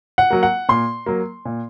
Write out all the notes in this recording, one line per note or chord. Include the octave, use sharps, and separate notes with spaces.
F#5
F#3 A#3
F#5
A#2 C6
F#3 A#3
A#2